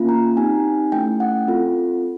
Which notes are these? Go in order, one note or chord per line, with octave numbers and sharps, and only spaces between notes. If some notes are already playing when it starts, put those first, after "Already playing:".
Already playing: A#3 C#4 F4
A#5
C4 D#4 G4 G#5
A3 C#4 E4 G5
F#5
C4 F4 A4